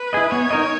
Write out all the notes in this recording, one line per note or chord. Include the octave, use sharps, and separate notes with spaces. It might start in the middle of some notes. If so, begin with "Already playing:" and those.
Already playing: B4
E4 G#4 D#5
B3 C#5
D#4 A#4 D#5